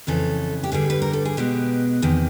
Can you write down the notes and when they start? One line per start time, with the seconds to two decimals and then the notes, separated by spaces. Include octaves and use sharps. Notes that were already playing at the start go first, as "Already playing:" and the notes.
0.07 F2 C#3 E3 A4
0.64 G4
0.72 G2 D3 G3 G#4
0.90 B4
1.02 A#4
1.13 A4
1.25 G#4
1.37 B2 G#3 B3 G4
2.02 E2 C3 D#3